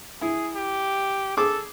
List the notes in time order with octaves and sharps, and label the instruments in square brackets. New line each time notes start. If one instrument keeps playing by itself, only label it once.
[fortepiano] E4 [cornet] G#4
[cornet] G4
[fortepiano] G#4 D6 [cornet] A4